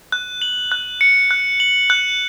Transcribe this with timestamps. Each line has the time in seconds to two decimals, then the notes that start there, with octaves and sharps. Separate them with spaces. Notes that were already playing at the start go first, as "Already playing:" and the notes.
0.12 F#6
0.42 F#7
0.72 F#6
1.01 C#7
1.31 F#6
1.60 F#7
1.90 F#6